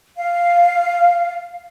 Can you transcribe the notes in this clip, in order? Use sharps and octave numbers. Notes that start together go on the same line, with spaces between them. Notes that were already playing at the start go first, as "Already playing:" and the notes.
F5